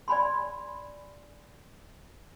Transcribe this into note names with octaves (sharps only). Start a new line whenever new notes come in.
D5 G#5 B5 C6